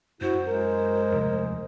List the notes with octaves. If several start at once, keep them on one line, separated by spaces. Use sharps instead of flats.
F#2 E4 F#4 C5
G#3 A#4
F1 D#2